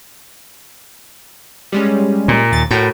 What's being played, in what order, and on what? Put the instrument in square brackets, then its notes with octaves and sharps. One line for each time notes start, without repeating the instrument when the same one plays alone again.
[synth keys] G3 G#3 C#4
[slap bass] A#2
[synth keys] D#2 A6
[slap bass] A2 [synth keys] F#4 A#4 G5